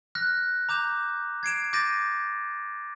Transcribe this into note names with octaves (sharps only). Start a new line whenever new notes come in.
F6 F#6 A#6
A#5 D6 G6 E7
G#6 C7 D7 E7
D6 G6 A6 A#6 D7 D#7